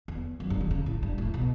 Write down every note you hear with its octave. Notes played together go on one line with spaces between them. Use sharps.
E2
F#2
G2
D3
C#3
A2
G2
A2
B2